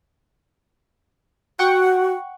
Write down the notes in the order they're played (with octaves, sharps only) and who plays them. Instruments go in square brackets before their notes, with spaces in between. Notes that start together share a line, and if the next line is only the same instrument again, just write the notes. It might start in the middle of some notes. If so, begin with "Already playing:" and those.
[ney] F#4 [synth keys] F#5 G5 C#6